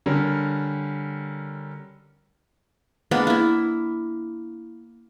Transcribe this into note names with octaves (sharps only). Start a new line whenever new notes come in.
D3 G3 C#4 A#4
G#3 A#3 B3 D4
A#3 E4